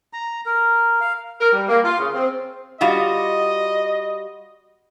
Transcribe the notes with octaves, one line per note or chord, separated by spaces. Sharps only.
A#5
A#4
F5
A#4
G3
A#3
F4
C#3
C4
G3 F4 F#4 D#5